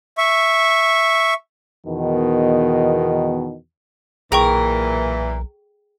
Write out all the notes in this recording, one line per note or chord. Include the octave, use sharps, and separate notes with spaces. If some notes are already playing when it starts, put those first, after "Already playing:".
E5 C#6
E2 B2 D#3
B1 A#2 E3 G#4 A#4 G5 C#6